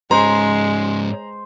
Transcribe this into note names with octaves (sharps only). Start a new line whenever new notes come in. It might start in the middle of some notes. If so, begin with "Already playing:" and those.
G#2 G#3 C#4 C5 A#5